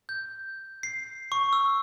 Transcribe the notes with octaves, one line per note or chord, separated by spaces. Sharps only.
G6
C7
C#6
E6